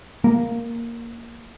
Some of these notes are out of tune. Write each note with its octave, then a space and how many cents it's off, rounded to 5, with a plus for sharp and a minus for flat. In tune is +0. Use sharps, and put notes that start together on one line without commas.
A#3 +0